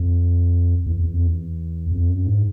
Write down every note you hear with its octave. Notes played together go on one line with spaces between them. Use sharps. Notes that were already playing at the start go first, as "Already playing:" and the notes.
Already playing: F2
E2
E2
F2
E2
F2
F#2
G#2